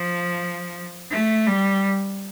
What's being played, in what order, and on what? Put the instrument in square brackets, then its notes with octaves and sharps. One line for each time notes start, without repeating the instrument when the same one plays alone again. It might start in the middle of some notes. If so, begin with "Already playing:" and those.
Already playing: [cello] F3
A3
G3